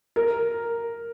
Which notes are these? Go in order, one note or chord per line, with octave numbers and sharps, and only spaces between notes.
A#4